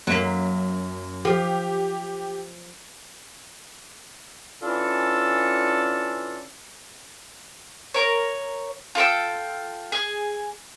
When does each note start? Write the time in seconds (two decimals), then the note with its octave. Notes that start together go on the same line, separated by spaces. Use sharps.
0.07 F#2 F#3 A#3 B6
1.25 F3 G4
4.63 E3 C#4 D4 F4 A4
7.94 A#4 C#5
8.95 F4 A4 G5 E6
9.92 G#4